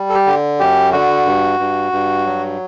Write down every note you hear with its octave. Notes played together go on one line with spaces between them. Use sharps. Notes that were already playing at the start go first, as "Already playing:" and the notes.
Already playing: G3
A4
G4
D3
F#2 G4
D3 F#4
G2
G2
G2
F#3